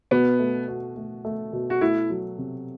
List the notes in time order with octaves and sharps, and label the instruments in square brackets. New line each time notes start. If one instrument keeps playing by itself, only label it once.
[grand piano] B2 [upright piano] B3
[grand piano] A3
F#4
A3
A3
B2
[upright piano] F#4
[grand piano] A3 [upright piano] E4
[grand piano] F#3
C3